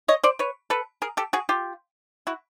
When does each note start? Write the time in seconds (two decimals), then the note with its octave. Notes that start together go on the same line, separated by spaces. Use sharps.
0.08 C#5 D#5
0.23 C5 D5
0.39 B4 C#5
0.70 A4 B4
1.02 G#4 A#4
1.17 G4 A4
1.33 F#4 G#4
1.49 F4 G4
2.27 E4 F#4